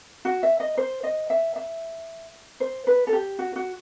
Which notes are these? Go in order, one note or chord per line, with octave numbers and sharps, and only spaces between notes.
F#4
E5
D#5
C5
D#5
E5
E5
C5
B4
A4
G4
F#4
F#4